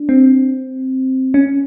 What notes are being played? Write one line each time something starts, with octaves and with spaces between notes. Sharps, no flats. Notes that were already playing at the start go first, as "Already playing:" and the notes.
Already playing: D4
C4
C#4